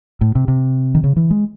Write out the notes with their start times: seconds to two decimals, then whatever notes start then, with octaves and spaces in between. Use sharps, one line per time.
0.21 A2
0.35 C3
0.48 C3
0.95 D#3
1.04 C#3
1.16 E3
1.31 G#3